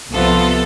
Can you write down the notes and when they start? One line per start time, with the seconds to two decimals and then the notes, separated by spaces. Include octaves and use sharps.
0.12 C2 C3 F3 B3 F4 A4